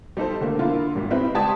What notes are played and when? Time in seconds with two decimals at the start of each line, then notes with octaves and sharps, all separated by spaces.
0.17 G3 D#4 A4 C5
0.40 D3 D#3 A3 A#3
0.59 D3 A#3 E4 F4
0.95 G#1 G3
1.11 C4 D#4 E4 B4
1.34 C#2 G4 D5 A5 D#6 G#6